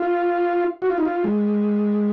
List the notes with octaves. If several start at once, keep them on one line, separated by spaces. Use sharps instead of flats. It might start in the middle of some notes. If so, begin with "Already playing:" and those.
Already playing: F4
F#4
F4
D#4
F4
G#3